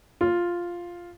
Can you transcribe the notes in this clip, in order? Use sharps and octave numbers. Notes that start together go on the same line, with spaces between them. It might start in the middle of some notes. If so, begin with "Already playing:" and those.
F4